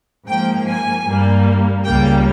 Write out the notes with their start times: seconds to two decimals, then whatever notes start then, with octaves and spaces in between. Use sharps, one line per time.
0.27 G#2 F3 A#3 G5
0.67 G#5
1.05 G2 G3 A#3
1.84 C#2 C#3 G3 A#3 G5